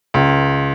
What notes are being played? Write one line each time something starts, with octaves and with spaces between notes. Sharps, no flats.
C#2